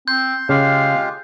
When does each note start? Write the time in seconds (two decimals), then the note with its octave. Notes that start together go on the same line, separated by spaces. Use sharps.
0.08 C4 C6 G6
0.49 C#3 G#3 F4 G4 F5